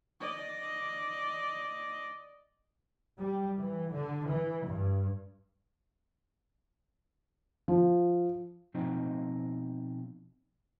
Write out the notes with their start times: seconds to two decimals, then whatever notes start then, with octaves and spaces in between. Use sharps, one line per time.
0.20 D5 D#5
3.19 G3
3.57 E3
3.93 D3
4.28 E3
4.66 G2
7.68 F3
8.74 B2 F3 C4 D#4 D#5